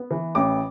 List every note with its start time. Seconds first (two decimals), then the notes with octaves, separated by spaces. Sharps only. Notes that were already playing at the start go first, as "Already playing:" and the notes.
Already playing: B3
0.11 E3
0.35 A1 D6